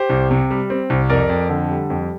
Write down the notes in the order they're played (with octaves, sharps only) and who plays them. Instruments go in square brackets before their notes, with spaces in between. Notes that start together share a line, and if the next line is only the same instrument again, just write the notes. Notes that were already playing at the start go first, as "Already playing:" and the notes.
Already playing: [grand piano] G4 C5
C2
C3
G3
C4
C2
F2 A#4 D5
F2
D3
G3
F2